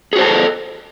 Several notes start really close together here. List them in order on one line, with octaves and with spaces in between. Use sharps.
G#4 F#4 C5 A5 A4